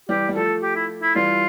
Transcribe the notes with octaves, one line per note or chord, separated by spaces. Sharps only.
E3 G3 G4
G3
F3 A3 A4
G4
E4
E4
E3 G3 F4